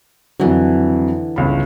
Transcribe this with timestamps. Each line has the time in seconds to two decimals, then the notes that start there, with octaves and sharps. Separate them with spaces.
0.40 F2 D3 E3 F#3
1.36 G1 C#2 B5